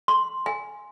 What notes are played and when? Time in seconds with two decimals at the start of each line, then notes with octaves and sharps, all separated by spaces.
0.08 C6
0.46 G#5